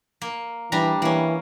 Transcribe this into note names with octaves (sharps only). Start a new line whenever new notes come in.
A#3
E3 G3 D4 A#5
E3 A#3 C#4